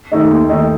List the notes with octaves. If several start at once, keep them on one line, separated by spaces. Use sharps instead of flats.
D#3 A3 D#4
D#2
D#3 A3 D#4